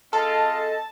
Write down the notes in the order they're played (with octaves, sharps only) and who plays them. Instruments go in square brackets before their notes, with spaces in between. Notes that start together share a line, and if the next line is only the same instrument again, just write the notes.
[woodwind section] G#3 C4 D#5 [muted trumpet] F4 [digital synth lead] A4 [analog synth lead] A5